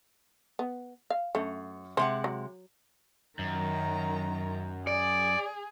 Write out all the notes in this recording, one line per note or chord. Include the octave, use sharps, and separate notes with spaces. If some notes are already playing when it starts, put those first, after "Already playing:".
B3
F5
F#2 A3
C3 G#3 C5 F#5
F#3
F#2 D#3 A#5
G#4 D5